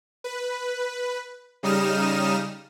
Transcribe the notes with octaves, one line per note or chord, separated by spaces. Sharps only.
B4
C#3 G3 D#4 D#6 F6 E7